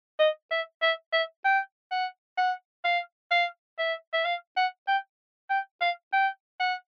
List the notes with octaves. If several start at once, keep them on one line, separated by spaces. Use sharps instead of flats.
D#5
E5
E5
E5
G5
F#5
F#5
F5
F5
E5
E5
F5
F#5
G5
G5
F5
G5
F#5